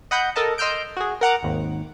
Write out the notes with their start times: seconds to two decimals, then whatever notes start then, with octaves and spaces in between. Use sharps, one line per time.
0.11 D#5 F#5 B5 G6
0.36 A4 A#4 D#5 A5
0.58 D#5 C6 E6 F6 G6 D7
0.97 F#4 G#4
1.21 A#4 F#5 A#5 D6
1.43 G#1 D#2